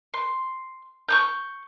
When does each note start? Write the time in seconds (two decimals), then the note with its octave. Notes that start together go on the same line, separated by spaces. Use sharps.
0.14 C6
1.09 C#6 D6 G6